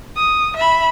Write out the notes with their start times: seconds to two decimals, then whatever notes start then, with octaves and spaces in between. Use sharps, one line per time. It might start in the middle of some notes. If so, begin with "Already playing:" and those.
0.16 D#6
0.57 E5 B5